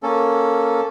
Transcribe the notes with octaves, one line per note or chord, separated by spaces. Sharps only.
A#3 C#4 A4